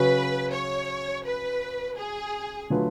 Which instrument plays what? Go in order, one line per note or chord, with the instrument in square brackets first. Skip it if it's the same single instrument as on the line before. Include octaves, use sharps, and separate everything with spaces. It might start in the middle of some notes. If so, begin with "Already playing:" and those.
Already playing: [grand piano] C#3 F#3 C#4 F#4 [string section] B4
[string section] C#5
B4
G#4
[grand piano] D3 F#3 A3 F4 B4